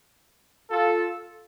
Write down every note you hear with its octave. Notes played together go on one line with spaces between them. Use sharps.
F4 A4